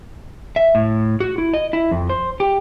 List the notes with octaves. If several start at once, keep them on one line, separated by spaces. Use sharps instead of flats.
E5
A2
F#4
E4
D#5
E4
F2
C5
G4